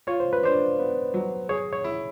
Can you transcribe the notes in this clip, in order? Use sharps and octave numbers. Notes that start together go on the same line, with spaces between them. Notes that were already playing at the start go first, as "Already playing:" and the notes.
F4 C#5
C5
B4
D4 C5
B3
F#3
G#4 C#5
C#5
E4